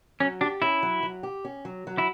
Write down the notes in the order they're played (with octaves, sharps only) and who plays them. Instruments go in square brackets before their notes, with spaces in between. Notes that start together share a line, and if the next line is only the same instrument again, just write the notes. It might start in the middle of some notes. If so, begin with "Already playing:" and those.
[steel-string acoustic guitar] F#3 [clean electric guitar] C#4
[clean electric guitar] D4 [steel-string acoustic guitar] G4
[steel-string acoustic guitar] C#4 [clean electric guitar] E4
[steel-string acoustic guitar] F#3
F#3
G4
C#4
F#3
F#3
[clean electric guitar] E4